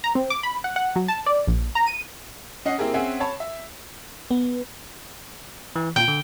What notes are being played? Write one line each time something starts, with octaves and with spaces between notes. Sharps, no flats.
A#5
C4
D6
B5
F#5
F#5
F#3
A5
D5
A#1
A#5
D#7
C#4 D#5 F#5 C7
A#3 C4 E4 G4 G#4 A#4
C4 C#4 G#4 E5 F#5 G#5
C#5 A5 B5
E5
B3
E3
A#2 F4 G5
D3